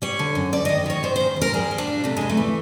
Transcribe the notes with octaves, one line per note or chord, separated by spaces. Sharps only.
G3 C#5
D3
F#2
D2 D5
D#3 D#5
D#3 C#5
D#3 C5
E2 C5
E2
A#4
G3 G#4
G3
D4
A#2
C3 A3
E2 G#3
A3
E3